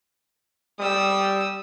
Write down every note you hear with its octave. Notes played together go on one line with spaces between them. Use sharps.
G3 D#6 E6